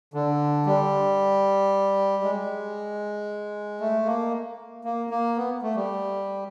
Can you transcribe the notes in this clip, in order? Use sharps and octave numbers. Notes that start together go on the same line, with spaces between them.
D3
G3
G#3
A3
A#3
A#3
A#3
B3
A3
G3